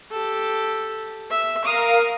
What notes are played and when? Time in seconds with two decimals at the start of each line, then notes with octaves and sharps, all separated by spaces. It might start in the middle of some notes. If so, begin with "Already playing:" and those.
0.11 G4 A4
1.30 E5
1.64 A#4 F5 D#6